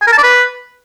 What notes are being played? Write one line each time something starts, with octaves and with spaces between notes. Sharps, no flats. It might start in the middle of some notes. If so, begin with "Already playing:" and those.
G#5
A#4
A5
D5
B4